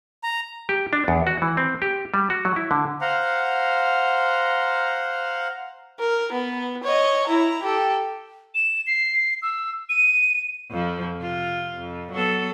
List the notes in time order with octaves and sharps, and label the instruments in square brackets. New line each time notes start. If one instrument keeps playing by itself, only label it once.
[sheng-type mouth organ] A#5
[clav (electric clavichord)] G4
D4
E2
F#4
E3
C4
G4
G3
F#4
F#3
E4
D3
[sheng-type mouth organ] C5 F5 F#5 A#5
[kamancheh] A#4
B3
C#5 D#5
E4 A#5
G4 A4
[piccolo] E7
C7
E6
D#7
[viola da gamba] F2 F3
C3 F4
F2
F#3 B3 A4